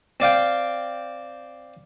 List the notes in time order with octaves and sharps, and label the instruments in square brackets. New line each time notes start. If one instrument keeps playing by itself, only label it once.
[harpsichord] C4 D5 F5 G5